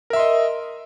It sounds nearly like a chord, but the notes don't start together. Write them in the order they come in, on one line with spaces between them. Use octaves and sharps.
A#4 E5 C6 D#5